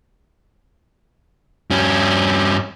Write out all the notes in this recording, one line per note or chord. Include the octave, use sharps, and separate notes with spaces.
G2 C#4